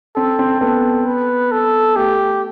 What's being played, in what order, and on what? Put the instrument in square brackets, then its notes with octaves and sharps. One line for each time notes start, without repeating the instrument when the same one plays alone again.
[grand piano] C4 [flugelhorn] A4
[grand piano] C4
[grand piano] B3 [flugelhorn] A4
[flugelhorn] B4
A4
[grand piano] A3 [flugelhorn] G4